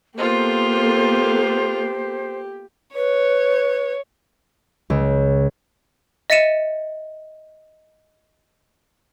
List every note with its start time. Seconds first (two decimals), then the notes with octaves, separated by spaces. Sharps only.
0.18 A#3 B3 F4 G4 A4 C5
2.95 B4 C#5
4.90 C#2
6.30 D#5 E5 A6 C#7 D#7 E7